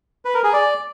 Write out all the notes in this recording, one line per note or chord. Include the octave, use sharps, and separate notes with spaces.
B4
A#4
G#4
D5